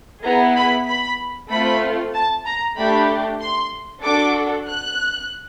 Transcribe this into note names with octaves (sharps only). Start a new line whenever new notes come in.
B3 E4 G#4 A#5
B5
B5
A3 C4 F4 B5
A5
A#5
A3 D4 G4 B5
C6
D4 F#4 A4 D6
F#6